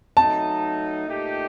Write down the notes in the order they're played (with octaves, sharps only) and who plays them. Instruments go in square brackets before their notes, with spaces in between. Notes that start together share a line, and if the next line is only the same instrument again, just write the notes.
[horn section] F#3 A3 D#4 [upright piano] A5
[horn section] A#2 A3 D#4 G4